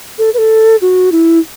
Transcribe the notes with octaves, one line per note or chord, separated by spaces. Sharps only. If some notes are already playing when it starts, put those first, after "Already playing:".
A4
B4
A4
F#4
E4